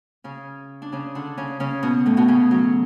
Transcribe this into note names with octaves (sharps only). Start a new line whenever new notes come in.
C#3 C#4
D4
C#3 C#4
D3 D4
C#3 C#4
C#3 C#4
B2 B3
A2 A3
B2 B3
C#3 C#4
F#3